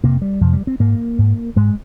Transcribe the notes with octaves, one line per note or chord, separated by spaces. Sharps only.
F2 C3 A#3
G3
F2 C3 F3
G3
C4
G#2 A#3
G#2
G#2 G#3